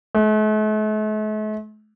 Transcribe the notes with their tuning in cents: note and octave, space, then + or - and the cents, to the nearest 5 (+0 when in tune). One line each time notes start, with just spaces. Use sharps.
A3 -45